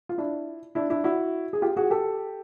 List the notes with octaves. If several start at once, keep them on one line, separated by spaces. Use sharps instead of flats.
F4
D4 E4
D4 E4
D4 E4
E4 F#4
G#4
F4 G4
F#4 G#4
G4 A4